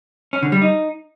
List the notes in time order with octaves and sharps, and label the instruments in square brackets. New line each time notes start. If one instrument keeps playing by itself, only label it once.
[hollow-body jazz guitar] C#4
D3
G3
D#4